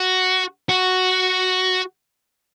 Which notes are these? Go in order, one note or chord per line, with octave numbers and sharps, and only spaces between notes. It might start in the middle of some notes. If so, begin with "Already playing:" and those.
Already playing: F#4
F#4